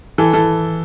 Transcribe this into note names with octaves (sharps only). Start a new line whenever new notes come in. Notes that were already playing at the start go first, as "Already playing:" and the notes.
E3 A4
E3 A4